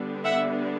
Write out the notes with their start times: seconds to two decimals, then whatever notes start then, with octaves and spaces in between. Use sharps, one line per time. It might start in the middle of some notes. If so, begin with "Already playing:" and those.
Already playing: D3 G3 B3 D4
0.25 E5 F#5